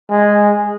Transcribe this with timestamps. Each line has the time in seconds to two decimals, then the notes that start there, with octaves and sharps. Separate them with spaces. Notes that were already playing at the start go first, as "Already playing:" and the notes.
0.10 G#3